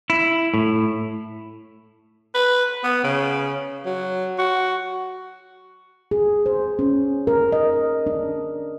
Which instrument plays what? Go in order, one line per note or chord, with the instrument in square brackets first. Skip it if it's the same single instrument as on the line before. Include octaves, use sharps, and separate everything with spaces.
[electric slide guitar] E4
A2
[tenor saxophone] B4
B3
C#3
F#3
F#4
[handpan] G#4
C5
C#4
A#4
D#5
D4